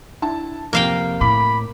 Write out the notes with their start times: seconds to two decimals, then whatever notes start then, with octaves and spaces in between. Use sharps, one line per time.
0.22 D4 E4 A5
0.73 F1 F3 A#3 F5 G5
1.21 A2 B5 D6